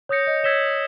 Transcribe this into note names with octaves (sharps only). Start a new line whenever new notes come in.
C#5 D#6 G6 A#6 C#7
D#5
C#5 E6 G#6 B6 E7 G7